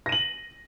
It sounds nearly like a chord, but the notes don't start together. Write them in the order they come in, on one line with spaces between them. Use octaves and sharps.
A#6 D#7 F#7